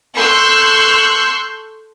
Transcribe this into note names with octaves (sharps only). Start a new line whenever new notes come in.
A4 C6 C#6 E6 F#6 G6